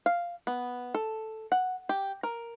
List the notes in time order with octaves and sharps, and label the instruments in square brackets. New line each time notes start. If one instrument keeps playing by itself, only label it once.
[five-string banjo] F5
B3
A4
F#5
G4
A#4